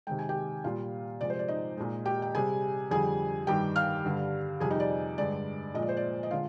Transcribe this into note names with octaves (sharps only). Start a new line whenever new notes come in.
C3 D#3 G#3 G5
G#5
G4 G5
A#2 G3 F4 F5
C3 F3 G#3 D5
C5
D5
D#4 D#5
A#2 G#3
G4 G5
G5
C3 G3 G#4 G#5
F2 D3 G3 G#4 G#5
G2 D#3 G3 G4 G5
F5 F6
G2 D3 G3
F2 C3 G3 G#4 G#5
D#4 D#5
D5
G2 D3 G#3 D5
A#2 F3 G#3 D#5
D5
C5
D5
D#5
D3 G#3 F4 F5